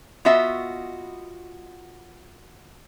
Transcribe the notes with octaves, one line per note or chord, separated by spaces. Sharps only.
B3 F4 F#4 D#5 E5